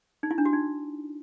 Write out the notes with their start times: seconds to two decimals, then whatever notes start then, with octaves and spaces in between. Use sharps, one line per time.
0.23 D#4
0.31 E4
0.38 D4
0.45 F#4
0.53 D#4